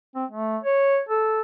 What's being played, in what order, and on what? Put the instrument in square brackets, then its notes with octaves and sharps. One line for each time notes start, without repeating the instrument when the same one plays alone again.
[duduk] C4
A3
C#5
A4